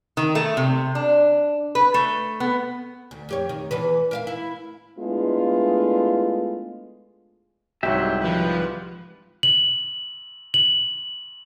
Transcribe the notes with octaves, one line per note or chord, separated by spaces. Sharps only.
D#3
A3
C3
D4
B4
A3
B3
D2
F2 G4 C#5
D#3
E2 E3 B4
A#4 E5 F5
E4
G#3 A3 B3 D4 E4 F4
C2 G#2 F#3 G4 E5
F3 B4
F#7
F#7